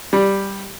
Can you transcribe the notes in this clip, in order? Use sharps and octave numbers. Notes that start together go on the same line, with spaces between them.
G3